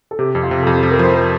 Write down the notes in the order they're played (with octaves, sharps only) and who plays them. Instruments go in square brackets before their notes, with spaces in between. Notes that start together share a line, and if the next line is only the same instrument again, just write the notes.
[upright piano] A4
[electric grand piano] C3 [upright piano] G4
[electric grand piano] F2
[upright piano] F4
[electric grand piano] C3
[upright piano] A4
[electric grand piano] F2 [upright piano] G4
[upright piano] A4
[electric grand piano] F3
[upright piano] A#4
[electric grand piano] F3 [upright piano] C5
[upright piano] A#4